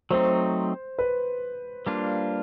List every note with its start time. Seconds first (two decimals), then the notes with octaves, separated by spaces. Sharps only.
0.11 F#3 A3 C4 D#4 C5
0.99 B4
1.86 G3 A#3 D4 F4